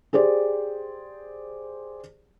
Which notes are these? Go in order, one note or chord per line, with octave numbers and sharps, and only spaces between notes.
G4 G#4 C5 D5